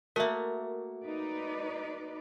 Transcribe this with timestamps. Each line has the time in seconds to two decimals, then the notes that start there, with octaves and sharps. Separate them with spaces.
0.16 A3 A#3 F#4 A#4 E5
1.04 D#4 B4 D5